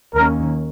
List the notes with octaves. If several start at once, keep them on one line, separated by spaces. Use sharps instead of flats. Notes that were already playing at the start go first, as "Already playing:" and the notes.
D#2 D#3 A#3 C#4 A#4